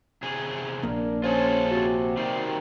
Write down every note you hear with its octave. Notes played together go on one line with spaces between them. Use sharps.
E2 C3 G#4
A#1 A#3 D4 A#4
C#4 F4 G#4 A4 C5
C3 F#4
D#3 G3 C7